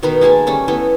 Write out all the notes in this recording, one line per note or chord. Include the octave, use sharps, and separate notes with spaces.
B2 D#3 D#4 B4
G#3 A#3 G#5 A5
G3 A3 C#4
A3 B3 E4 D#5